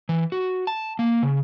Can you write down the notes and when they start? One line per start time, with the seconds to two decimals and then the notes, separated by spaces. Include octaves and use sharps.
0.09 E3
0.32 F#4
0.67 A5
0.99 A#3
1.23 C#3